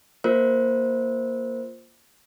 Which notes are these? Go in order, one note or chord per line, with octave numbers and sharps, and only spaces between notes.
A#3 F4 A#4 C5